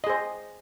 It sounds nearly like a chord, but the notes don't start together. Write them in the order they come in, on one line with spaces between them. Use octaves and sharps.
D#5 G#4 C5